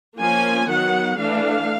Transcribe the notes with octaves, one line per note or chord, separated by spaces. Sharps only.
F3 A#3 C#4 G#5
D#3 F#3 B3 F#5
E3 A3 D4 F5